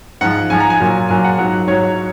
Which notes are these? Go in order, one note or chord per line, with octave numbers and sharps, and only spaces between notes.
G#2 F3 F#5
G#2 F3 G#5
A#5
G#5
A#2 F#3
A#2 F#3 G#5
F#5
G#2 F#3 F#5
G#2 F#3 C#5